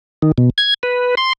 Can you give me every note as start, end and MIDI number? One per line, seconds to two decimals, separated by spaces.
0.22 0.32 51
0.38 0.50 47
0.58 0.74 92
0.83 1.15 71
1.17 1.33 84